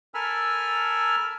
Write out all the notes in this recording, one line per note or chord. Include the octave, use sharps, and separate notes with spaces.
A4 A#4 G#5 B5 E6 F6